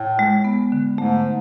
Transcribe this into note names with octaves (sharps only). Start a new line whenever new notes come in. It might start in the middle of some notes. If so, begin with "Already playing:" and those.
Already playing: A2
G#3
B3
D3
G#2 A3